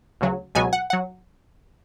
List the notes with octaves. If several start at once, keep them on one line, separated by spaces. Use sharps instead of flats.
D2 C#3 F#3
C#2 B2 F#3 G#5
F#5
F#5
F#3